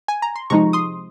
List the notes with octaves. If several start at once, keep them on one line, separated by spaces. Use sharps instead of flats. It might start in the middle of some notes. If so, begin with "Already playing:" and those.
G#5
A#5
C6
C3 F3 G#3 D#4 A#5 C#6
C6 D#6